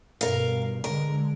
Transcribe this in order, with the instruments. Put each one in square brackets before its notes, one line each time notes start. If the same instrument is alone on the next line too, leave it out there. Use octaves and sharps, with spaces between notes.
[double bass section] G2 B2 [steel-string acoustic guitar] A#4 F5
[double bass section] D3 G#3 [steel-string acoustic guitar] A#4